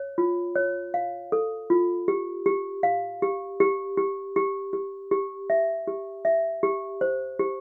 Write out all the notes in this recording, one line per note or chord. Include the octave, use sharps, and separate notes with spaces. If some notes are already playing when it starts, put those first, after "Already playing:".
Already playing: C#5
F4
C#5
F5
A4
F4
G4
G4
F5
G4
G4
G4
G4
G4
G4
E5
G4
E5
G4
C5
G4